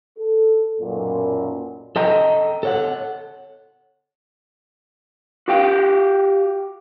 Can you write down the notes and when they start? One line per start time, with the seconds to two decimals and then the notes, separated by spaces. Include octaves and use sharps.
0.19 A4
0.81 B1 F#2 A#2
1.96 A4 D#5 G5 A#5
2.63 A4 C#5 F#5
5.48 F#4 G4 F5 G5